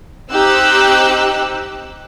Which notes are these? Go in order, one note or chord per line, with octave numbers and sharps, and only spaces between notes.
C4 D#4 G4 E6 F#6